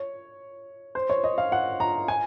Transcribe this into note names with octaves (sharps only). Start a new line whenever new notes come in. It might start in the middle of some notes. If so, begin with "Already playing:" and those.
Already playing: C#5
C5
C#5
D#5
F5
F#5
A#5
G#5